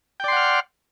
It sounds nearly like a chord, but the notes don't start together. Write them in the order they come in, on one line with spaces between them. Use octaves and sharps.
G5 D5 C6 F#5 F6